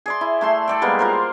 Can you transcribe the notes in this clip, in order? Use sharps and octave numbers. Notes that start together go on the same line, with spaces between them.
G#4 D5 C6
E4
A3 A5 C6
A4 D5 G5
G3 G#3 A#3 B3
F4 A#4 C5